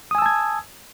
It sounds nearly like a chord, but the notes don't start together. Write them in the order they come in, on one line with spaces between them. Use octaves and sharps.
D#6 G#5 E6 A5 G#6